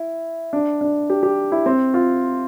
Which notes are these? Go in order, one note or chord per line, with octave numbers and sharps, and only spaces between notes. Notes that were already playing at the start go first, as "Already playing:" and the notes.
Already playing: E4
D4
D4
G4
G4
E4
C4
F4